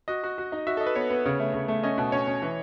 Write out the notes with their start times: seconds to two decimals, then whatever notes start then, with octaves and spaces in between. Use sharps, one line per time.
0.08 F#4 D#5
0.23 F#4
0.38 F#4
0.52 D#4
0.67 F#4 E5
0.77 A4 D#5
0.86 B4
0.96 B3 C#5
1.10 B3
1.26 C#3
1.40 A3
1.54 C#3
1.68 A3
1.83 C#4 D#5
1.98 B2
2.12 C#4 C#5
2.27 C#4
2.42 E3